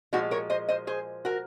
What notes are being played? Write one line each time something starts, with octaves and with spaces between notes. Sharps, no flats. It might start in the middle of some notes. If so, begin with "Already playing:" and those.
A#2 F3 G#3 D#4 F#4
A#4 C#5
C5 D#5
C5 D#5
G#4 C5
F#4 A#4